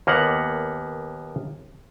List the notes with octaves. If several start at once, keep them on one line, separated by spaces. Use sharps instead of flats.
D#2 A#3 B3 F#5